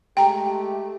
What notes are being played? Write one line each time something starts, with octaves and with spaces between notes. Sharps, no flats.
G#3 A3 G4 G5 A#5